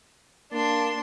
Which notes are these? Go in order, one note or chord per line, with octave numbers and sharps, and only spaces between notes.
A#3 D4 C6